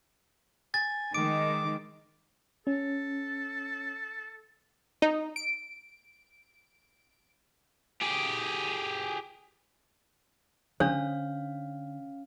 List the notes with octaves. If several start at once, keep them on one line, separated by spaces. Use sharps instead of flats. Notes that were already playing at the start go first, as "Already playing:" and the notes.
G#5 A6
D#3 G#3 D6 D7
C#4 A4
D#4
D7
G4 G#4
D3 C#4 D4 C5 F5